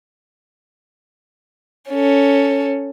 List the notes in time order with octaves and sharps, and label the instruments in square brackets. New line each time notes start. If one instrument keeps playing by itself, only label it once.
[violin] C#4 A4